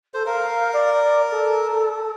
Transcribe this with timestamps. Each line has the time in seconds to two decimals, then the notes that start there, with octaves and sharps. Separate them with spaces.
0.14 A4 C5
0.26 A#4 F5
0.73 D5
1.31 A4